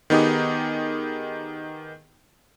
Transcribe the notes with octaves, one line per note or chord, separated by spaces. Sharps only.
D#3 B3 D#4 G4 G#4